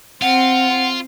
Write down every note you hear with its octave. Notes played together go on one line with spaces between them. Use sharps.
C4 F4 F#5